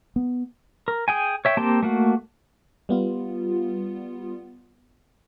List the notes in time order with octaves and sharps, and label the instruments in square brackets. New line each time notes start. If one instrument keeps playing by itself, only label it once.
[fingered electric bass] B3
[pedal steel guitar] A#4
G#4 G5 G#5
C#5 E5 G5
A#3 C4 G4 G5 A5
A3 A#3 F#4
[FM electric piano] G3 B3 F4